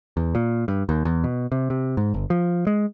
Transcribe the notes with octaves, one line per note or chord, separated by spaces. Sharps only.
E2
A#2
G2
D#2
E2
B2
C3
C3
G#2
G1
F3
G#3